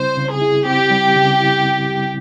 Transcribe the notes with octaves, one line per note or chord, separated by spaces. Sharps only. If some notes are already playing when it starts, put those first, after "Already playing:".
Already playing: C#3 G3 C4 E4 C5
C#3
G#4
E4
C4 G4
G3
C#3
E4
C4
G3